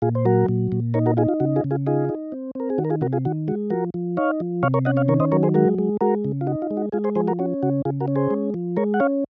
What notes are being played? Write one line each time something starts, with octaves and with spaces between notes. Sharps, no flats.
A#2 F4 G#4
C5
F#3 F#4 A#4
A#2
A#2
D#4 A#4 C#5
F#4 A#4
D#4 F4 G#4
F4
C#3 F#4
F4 G#4
C#3
F4 G#4
D#4 F4 G#4
D#4
C4
C4 A#4
G#4
D#3 F#4
A#4
F4 G#4
C3 F#4 A#4
F4 G#4
D#3 F#4
G#3 F#4
F3 F#4 A#4
F3
D#4 C#5 F5
F3
C3 C#5 F5
A#4 C#5
C#4 D#5 F#5
C#5 F5
D#3 A#4 C#5
C5 D#5
F#3 A#4 C#5
G#4 C5
G#3 F#4 A#4
G#3
G#3 F#4 A#4
C#3
F4
D#4 F#4
F4
G#3
F#4
G#3 F4 G#4
G#4 C5
F3 G#4 C5
F#4 A#4
C#4 F#4
C#3 F#4
C#3 F4 G#4
F#4 A#4
C#4
G#4 C5
G#3
F3
G#3 A#4 C#5
F#5
C#4 C#5 F5